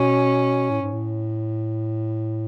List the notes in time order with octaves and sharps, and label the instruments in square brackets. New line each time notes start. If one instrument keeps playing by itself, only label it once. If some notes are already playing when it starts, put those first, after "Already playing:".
Already playing: [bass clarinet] B2 [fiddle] C#4
[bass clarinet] A2
G#2
A2